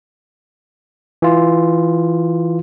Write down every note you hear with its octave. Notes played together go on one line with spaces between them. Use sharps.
E3 F4